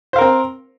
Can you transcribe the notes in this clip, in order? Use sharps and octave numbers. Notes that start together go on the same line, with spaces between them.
C4 A#4 C5 F5